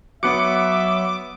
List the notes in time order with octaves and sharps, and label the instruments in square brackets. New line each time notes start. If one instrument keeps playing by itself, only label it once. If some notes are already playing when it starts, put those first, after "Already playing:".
[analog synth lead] F#3 [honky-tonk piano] B3 F#6 C#7 [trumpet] E5 [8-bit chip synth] D6